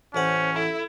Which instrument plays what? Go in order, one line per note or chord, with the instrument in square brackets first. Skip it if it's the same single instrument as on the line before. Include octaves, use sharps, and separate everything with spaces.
[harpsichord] A1 A3 F#5 [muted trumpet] C#4 [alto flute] C5
[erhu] E4 [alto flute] A4